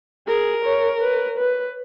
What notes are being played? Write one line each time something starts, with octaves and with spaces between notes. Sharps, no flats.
G#4 A#4
C#5
B4
B4